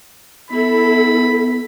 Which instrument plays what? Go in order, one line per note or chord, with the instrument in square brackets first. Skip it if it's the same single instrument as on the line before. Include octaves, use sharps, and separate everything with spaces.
[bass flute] B3 [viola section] E4 A4 [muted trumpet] B5